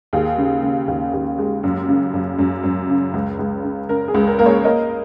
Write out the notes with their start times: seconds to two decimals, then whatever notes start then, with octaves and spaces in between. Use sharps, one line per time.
0.13 D#2 G#4
0.38 C#3
0.63 C#3
0.88 D#2
1.13 D#2
1.38 G#3
1.63 F#2
1.89 C#3
2.14 F#2
2.39 F#2
2.63 F#2
2.89 C#3
3.14 C#2
3.39 C#2
3.64 C#3
3.89 C#3 A#4
4.08 G#4
4.14 C#2
4.27 A#4
4.39 A#3 A#4
4.46 G#4 C#5
4.65 A#3 A#4 D#5